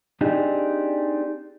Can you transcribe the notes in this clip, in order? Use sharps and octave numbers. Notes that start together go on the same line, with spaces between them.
C4 D4 D#4 G4 G#4